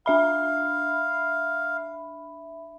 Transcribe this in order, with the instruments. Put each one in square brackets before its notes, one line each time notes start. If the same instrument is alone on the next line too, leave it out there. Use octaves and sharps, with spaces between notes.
[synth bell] D4 E5 B5 [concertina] F5